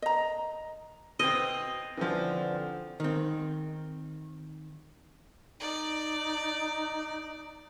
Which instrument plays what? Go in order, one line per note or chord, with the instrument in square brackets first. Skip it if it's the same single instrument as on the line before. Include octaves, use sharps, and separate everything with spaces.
[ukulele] D#5 A#5
[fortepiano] B2 C4 [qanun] D#5
[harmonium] D3 C4 [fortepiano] E3 F3
[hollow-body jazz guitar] D#3 C4
[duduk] D#4 [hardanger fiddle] D5